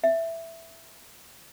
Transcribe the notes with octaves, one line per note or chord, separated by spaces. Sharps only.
E5